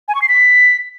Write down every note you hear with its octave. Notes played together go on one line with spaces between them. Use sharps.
G#5
C#6
C7
B6